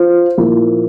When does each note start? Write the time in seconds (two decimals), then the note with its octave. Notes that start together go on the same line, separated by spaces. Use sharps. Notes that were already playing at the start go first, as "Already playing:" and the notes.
Already playing: F4 C5
0.37 A#2 F3 A#3 E4